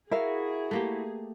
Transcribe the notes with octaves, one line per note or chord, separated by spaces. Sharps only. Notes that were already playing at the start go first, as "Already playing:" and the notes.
E4 F#4 G#4 A#4 E5 F5
A3 A#3 G4